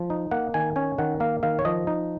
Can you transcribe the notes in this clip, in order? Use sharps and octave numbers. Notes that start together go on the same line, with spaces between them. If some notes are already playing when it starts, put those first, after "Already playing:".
Already playing: F3
D#4
A#3 F#5
D#3 G#5
C#4 G#5
D#3 F#5
A#3 F5
D#3 F5
C#5
F3 D#5
D#4